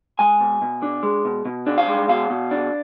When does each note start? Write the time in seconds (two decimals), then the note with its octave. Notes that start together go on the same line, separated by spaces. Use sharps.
0.19 G#3 G#5
0.40 B2
0.62 B2
0.83 D4
1.03 G#3
1.25 B2
1.45 B2
1.66 D4
1.78 F5
1.88 G#3
2.09 B2 F5
2.30 B2
2.51 D4